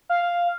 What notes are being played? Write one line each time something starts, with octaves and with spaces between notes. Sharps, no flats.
F5